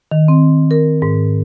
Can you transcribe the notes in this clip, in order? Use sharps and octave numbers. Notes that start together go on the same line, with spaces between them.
D#3
C4
A#4
G#2